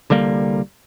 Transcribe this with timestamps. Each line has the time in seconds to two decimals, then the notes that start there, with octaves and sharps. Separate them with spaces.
0.10 C2 D3 G3 A#3